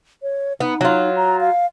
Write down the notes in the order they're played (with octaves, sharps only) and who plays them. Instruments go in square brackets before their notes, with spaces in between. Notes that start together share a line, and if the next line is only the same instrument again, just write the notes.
[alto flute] C#5
[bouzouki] B3 [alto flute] D#4
[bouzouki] F#3 F4
[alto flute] A#5
F5